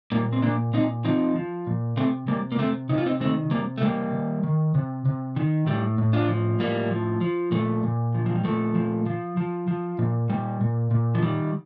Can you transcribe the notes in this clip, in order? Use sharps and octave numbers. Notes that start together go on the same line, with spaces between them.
A#2 G3 A#3
C4
A#2 A#3 D4
A#2 C4 D#4
F3 C4 D#4
F3
A#2
C3 A3 C4
C3 G3 A#3
A#3
C3 A3 C4
C3 D#4
F4
C4 D#4
D#3 A3 C4
C3 G3 A#3
A3
C3 G3 A#3
D#3
D#3
C3
C3
D#3
A2 G3
A2
D4 F4
F3
A2 G3 A#3
F3
F3
A#2 F3 A3
A#2
F3
F3
G3
A#2 F3 A3
F3
F3
F3
F3
A#2
A#2 G3
A#2
A#2
F3
D#3 G3